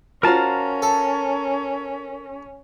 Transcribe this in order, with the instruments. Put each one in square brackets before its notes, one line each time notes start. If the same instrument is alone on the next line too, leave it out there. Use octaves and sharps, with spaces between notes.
[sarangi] C#4 [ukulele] F4 F#4 C5 [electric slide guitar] A#4 A5 A#5
[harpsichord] A4